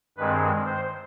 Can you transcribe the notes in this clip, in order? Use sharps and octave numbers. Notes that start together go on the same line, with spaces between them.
G2 D#3 G#3 C4 B4
C5